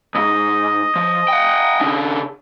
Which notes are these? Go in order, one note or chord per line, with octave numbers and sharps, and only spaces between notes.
C#2 G#2 D#5
F3
F#5 G5
C#3 D4